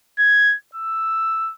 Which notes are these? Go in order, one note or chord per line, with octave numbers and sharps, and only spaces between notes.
G#6
E6